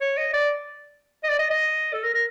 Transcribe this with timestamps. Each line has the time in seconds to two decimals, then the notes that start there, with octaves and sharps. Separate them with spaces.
0.01 C#5
0.17 D#5
0.33 D5
1.24 D#5
1.29 D5
1.39 D#5
1.50 D#5
1.93 A4
2.04 A#4
2.14 A#4